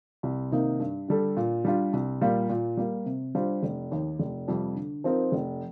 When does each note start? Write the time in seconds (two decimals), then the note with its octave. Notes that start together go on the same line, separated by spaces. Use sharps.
0.23 C2
0.52 C3 D#3 A#3 D#4
0.80 G2
1.08 D3 G3 D4 A4
1.37 A#2
1.65 G3 D4 F4
1.93 C2
2.21 A#2 G3 A#3 F4
2.50 A#2
2.77 G3 A#3
3.06 C3
3.35 G3 D4 F4 C5
3.63 F1
3.92 D#2 D#3
4.19 F1
4.48 F2 C3 G3
4.75 D3
5.04 F3 C4 D#4 A#4
5.32 F1